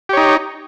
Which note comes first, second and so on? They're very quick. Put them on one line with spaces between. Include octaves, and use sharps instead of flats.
G4 C#5 D#4